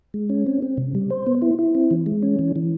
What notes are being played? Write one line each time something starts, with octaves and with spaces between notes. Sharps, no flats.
G#3
C#4
C4
C4
C3
G3
C5
B3
E4
E4
C4
E3
G#3
C#4
E3
E3